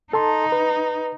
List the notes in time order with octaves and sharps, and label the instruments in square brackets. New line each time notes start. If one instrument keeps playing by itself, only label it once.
[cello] D#4 [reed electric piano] A4 A5 C6
[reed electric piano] B4